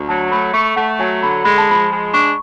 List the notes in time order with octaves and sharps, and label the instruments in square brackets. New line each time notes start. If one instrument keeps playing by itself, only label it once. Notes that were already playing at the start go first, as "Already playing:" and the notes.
Already playing: [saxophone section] D2
[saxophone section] F#3 [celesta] A5
[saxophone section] A3 [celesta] B5
[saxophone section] A3 [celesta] C#6
[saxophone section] A3 [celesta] F#5
[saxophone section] F#3 [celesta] G#5
[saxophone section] D3 [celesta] B5
[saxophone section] G#3 [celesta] B5
[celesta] A5
[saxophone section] F3 [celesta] B5
[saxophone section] G#3
[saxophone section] D4 [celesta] C#6